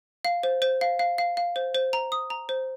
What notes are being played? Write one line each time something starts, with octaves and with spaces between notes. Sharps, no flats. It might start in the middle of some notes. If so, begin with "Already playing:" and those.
F5
C5
C5
F5
F5
F5
F5
C5
C5
A#5
D#6
A#5
C5